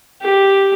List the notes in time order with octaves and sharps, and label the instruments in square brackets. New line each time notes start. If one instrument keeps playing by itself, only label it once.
[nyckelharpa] G4